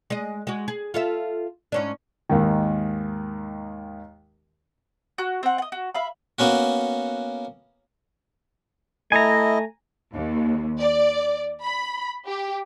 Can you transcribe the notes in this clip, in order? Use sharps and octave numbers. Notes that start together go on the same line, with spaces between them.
G#3 D#5
G#3 F#4
G#4
F4 A4 E5
G#2 C#4 D4
D#2 G#2 D#3
F#4 F#6
C4 F#5
D#5 F#5
F#4
E5 F5 B5
A#3 B3 C#4 F#4
A3 E4 D#5 G#5 A#5
D#2
D5
B5
G4